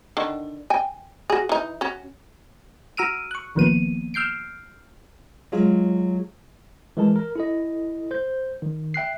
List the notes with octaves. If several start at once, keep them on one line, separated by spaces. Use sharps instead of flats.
D3 D#3 D4
G5 G#5
F#4 G#4
E3 D#4
C#4 F#4
F#4 A#5 E6 F6 D7 D#7
C#6 F#6
A1 D#3 F3 A#3 B3 D#7
E6 F6 G6 C7 D7
F#3 G#3 F4
E3 G#3 A#4 A5
A#4
E4 A4 D#5
C5 G6
D#3
E5 G5 F#6 C7